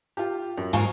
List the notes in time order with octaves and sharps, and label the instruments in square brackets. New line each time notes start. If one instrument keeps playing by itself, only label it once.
[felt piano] F4 G4
F#2
[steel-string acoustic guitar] G#2 F4 A#4 [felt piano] F5 G#5 C#6